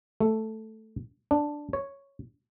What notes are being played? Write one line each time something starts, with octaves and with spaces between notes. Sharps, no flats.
A3
D4
C#5